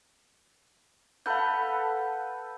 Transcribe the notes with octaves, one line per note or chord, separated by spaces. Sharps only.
A4 B4 F5 F#5 B5 G6